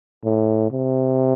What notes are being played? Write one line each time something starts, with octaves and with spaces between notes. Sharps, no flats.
A2
C3